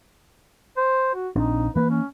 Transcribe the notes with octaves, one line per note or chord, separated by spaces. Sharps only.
C5
F#4
A#1 C4 D4 D#4
E3 A#3 B4
C#4